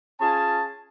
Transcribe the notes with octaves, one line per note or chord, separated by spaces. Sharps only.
C#4 F4 G#4 G#5 A5